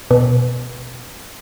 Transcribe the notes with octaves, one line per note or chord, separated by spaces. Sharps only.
B2